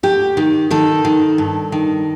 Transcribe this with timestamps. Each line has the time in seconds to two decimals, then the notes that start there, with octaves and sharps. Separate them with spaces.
0.03 D2 G4
0.37 D#3
0.71 D#3 A4
1.05 D#3
1.38 G2
1.72 D#3